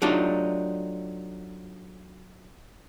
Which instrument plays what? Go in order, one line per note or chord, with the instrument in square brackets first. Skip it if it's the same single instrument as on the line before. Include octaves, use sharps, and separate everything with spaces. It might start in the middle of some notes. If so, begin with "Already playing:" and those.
[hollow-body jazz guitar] F#3 A3 D4 D#4 F4 G4